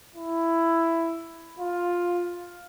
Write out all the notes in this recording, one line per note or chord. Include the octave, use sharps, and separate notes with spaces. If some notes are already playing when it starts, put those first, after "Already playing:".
E4
F4